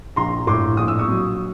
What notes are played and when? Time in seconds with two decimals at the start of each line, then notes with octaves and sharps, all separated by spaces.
0.16 A#1 A#5 C6
0.47 A2 C6 D6
0.77 A#1 D#6
0.88 E6
0.99 C#6 D#6
1.08 F#3